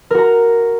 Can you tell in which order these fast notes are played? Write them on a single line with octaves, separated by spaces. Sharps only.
A#4 F#4 A#5